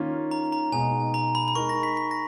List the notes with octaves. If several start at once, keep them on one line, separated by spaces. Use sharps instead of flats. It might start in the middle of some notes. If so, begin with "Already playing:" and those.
Already playing: D#3 A#3 C#4 F4
A#5
A#5
B2 G#3 D#4 G#5
A#5
B5
B5
G#3 D#4 A#4 C#6
A#6
B6
B6
A#6